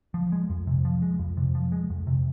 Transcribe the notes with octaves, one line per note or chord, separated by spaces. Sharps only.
F3
G#3
F2
C3
F3
G#3
F2
C3
F3
G#3
F2
C3